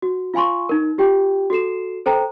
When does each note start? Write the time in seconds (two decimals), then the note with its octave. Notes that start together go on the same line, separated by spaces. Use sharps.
0.02 F#4
0.34 F4 F5 G#5 C6 C#6
0.69 D#4 A#4
0.98 F4 G4 G5
1.50 F#4 A4 C7 E7
2.06 A4 C5 G5 A#5